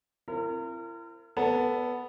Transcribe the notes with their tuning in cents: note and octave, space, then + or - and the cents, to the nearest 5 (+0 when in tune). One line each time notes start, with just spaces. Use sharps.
C4 +5 E4 +45 A#4 -35
B3 +0 A4 +0 D5 -35